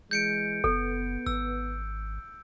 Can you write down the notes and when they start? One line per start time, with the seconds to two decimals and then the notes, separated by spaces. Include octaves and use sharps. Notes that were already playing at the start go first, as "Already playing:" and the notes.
0.11 E3 G#3 G6 C#7 D7
0.64 F#1 B3 A4
1.26 G#1 E6